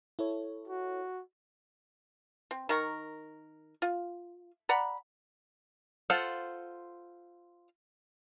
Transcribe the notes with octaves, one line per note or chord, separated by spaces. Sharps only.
E4 A4 C#5
F#4
C4
D#3 A#4 C#6
F4
D5 F#5 A#5 B5
F4 A4 C5 F#5